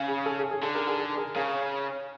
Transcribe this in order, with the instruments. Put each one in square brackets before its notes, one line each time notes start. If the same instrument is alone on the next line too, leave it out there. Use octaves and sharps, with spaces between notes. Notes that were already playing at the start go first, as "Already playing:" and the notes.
Already playing: [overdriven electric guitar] C#3
[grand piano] G#4
A4
G#4
G#4
[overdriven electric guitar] D3 [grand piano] A4
[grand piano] G#4 A#4
G#4 A#4
G#4 A#4
G#4 A#4
[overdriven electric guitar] C#3 [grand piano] G#4 A#4